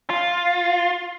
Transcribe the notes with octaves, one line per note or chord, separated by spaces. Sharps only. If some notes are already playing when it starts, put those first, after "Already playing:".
F4